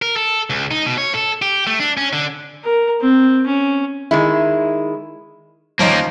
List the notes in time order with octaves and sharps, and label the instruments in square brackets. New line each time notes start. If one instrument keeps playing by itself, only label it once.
[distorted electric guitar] A#4
A4
C#2
D#4
B2
C#5
A4
G4
A3
D4
C#4
D3
[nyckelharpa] A#4
C4
C#4
[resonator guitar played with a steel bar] D#3 G#3 E4
[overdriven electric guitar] D#3 A#3 [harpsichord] F3 C#4 D#4